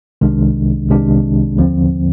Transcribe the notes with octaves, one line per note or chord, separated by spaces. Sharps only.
C2 C3 D#3 G#3 D4
C2 C3 D#3 G#3 D4
D#2 D3 F3 C4